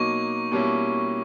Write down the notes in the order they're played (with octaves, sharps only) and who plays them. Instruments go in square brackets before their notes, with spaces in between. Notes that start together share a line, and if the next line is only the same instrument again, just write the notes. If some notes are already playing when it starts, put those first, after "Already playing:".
Already playing: [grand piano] B2 F#3 A#3 D#4 [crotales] C#6
[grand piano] B2 G3 A#3 C#4 E4